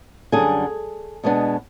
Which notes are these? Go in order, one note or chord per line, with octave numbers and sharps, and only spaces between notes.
F#2 D3 G3 G#4 G#5
B2 G#3 B3 D4